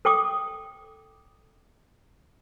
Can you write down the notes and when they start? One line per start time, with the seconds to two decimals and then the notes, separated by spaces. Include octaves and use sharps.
0.05 A4 G5 D6 D#6